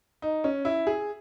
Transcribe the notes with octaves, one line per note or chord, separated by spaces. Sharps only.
D#4
C#4
E4
G#4